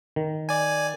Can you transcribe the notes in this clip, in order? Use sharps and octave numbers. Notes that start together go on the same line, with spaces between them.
D#3
D5 G#5